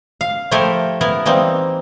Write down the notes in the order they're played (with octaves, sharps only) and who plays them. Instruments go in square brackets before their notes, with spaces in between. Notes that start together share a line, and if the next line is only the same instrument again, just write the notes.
[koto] F5
F3 A3 E4 G4 A4 A#4
B3 E4 A#4
E3 G3 A#3 C4 D#4